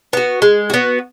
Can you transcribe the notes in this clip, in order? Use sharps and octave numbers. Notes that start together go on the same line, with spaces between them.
B3 F#4
G#3
B3 F#4